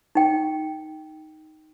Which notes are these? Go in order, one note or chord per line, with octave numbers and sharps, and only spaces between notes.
D#4 G5